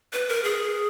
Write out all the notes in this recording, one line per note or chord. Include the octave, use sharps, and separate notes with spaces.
B4
A#4
G#4